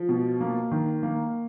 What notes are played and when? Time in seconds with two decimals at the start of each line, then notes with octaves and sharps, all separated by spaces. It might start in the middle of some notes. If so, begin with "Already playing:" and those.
Already playing: F3
0.09 B2
0.41 A#3
0.71 D#3
1.03 A#3